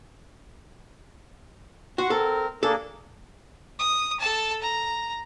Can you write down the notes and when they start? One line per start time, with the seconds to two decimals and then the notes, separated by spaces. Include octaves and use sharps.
1.98 F#4 F#5 C6 C#6
2.10 C4 A4 A#4
2.63 A#3 D4 G#4 A4
3.79 D#6
4.20 A4 A5
4.62 A#5